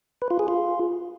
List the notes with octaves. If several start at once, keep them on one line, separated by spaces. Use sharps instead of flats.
B4
F4
G#4
F4